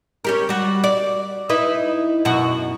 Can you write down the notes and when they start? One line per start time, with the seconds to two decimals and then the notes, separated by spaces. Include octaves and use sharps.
0.25 C#4 G4 A#4
0.49 G3 F#4
0.84 D5
1.49 D#4 E4 B4
2.25 F#2 B2 F#4